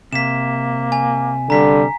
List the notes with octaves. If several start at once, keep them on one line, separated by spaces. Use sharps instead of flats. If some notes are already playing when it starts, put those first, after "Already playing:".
C3 A#3 B6 E7
G#5
D3 G3 A#5 B6